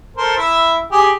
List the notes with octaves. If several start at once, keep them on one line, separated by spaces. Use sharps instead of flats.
A4 A#4 C5
E4 E5
G4 G#4